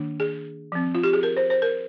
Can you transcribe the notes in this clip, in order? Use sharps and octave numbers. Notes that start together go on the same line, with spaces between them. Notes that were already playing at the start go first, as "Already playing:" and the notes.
Already playing: D#3 A#3 D4
G#4
F3 C4
F4
G4
G#4
A#4
C5
C5
A#4